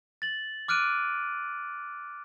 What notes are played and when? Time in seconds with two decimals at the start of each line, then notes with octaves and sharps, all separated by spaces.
0.22 A6 F#7
0.68 D6 F6 F#6 D7 D#7